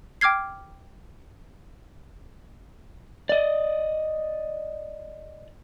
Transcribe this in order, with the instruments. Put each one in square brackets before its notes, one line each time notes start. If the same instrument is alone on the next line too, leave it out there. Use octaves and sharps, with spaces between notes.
[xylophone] G5 D6 F6 G#6 C7
[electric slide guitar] D5 D#5